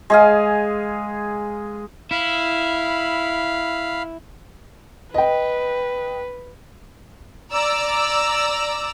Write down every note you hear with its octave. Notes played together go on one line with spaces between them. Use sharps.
G#3 G#4 F5
E4 F5 B5
B4 D#5 G5
D5 A#5 E6